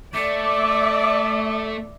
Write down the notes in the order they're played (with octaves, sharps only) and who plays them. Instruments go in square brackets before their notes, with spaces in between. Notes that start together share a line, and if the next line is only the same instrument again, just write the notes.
[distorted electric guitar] A3 [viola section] D5 E5 [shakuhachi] D6